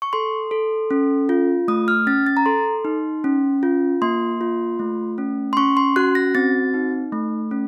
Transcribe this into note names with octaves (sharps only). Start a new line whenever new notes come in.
C#6
A4 C6
A4
C#4
F4
A3 D#6
F6
C#4 A6
A6
A#5
A4 C6
D#4
C#4
F4
A#3 C6
F4
A3
C#4
C6
C#4 C#6
C6
F#4 F#6
A#6
C4 A6
D#4
A3
C#4